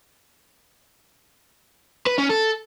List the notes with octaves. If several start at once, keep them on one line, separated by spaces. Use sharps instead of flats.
B4
C#4
A4